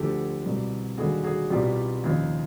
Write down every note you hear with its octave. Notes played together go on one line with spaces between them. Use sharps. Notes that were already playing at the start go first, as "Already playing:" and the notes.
Already playing: D2 D3 F3 G4 A4
C2 B2 G3
D#2 D3 G3 F#4 G#4
F#4 G#4
C2 B2 G3 F4 G4
D#2 C#3 F3